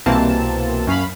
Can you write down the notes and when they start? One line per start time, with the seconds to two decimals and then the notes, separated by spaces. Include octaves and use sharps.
0.06 C2 B2 E3 A#3 C4 A5
0.87 F#2 C#4 F5 B5